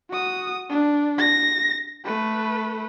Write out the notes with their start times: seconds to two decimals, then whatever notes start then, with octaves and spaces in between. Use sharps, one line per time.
0.10 F#4 D#6
0.70 D4
1.19 A#6
2.05 A3 B4